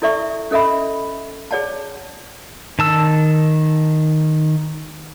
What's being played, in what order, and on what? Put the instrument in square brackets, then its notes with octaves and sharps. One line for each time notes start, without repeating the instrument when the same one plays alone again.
[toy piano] E4 A4 D5 E5 C#6
C#4 A4 D#5 E5 B5
G#4 C#5 D5 F#5 A5
[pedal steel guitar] D#3 A5 E6